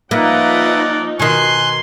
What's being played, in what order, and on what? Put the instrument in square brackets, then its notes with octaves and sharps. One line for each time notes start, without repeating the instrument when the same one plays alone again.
[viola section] F3 D#4 [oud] A#3 [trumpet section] A#4 D5 F#5 [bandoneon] B4 E5
[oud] B2 D#3 [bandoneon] G#5 F#6 [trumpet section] C6